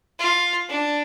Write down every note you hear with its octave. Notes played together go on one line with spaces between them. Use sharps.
F4
D4